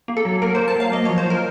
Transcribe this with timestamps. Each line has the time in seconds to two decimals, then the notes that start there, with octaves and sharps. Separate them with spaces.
0.08 A#3
0.17 A4
0.25 F#3
0.42 A#3 A#4
0.55 C5
0.59 F#3
0.68 A5
0.75 F#3 F5
0.92 A#3 D#5
1.05 C#5
1.09 F3
1.18 C5
1.26 F3 A#4